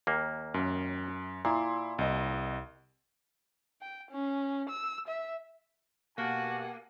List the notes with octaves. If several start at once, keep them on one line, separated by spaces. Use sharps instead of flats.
D#2 A#3
F#2
A#2 E4 C6
C2 D#5
G5
C#4
E6
E5
B2 A#3 F#4 G4 F#5 G#5 A5